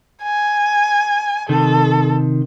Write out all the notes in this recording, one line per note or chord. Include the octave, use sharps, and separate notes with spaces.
G#5
C3 D#3 A4